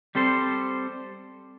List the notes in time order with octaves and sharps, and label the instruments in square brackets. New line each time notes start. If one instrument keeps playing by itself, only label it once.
[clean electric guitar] G3 C4 A4 C5